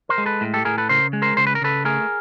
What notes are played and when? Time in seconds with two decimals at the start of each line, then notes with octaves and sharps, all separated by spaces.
0.09 A#4 C5
0.18 G#3
0.26 A4 B4
0.41 A2
0.54 G4 A4
0.65 A2 G#4 A#4
0.78 A4 B4
0.89 C#3 A#4 C5
1.13 G#3
1.22 A#4 C5
1.37 C#3 C5
1.47 B4
1.55 A#4
1.62 C#3 A4 B4
1.85 A3 G#4 A#4